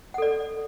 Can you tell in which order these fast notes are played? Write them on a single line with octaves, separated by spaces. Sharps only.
F#5 A4 D5